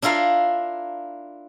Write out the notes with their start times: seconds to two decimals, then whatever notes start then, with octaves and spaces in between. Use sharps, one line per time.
0.02 D4 E4 F4 A#4 F5